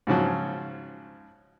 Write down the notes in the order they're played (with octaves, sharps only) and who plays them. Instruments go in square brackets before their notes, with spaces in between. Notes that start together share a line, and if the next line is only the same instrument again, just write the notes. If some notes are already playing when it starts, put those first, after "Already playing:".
[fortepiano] G#2 C#3 F3 F#3